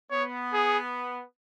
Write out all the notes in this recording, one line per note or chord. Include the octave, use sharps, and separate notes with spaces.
B3 C#5
G#4